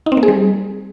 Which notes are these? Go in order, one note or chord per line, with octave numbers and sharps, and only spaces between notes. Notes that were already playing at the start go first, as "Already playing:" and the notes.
D#4
C4
A#3
G#4
G3